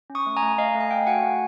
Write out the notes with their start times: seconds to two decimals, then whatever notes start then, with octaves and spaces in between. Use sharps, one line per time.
0.10 C#4
0.15 C#6 D#6
0.26 A3
0.36 G#5 A#5
0.42 A3
0.58 A3 D#5 F5
0.75 A3
0.80 G#5
0.91 A3 F5 G5
1.07 F#4 F#5 G#5
1.23 A3